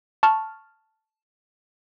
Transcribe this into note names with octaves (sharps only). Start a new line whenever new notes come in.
A5 C#6 F6